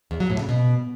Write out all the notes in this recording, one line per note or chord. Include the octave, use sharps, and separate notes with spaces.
E2
F#3
A2
C#3
B2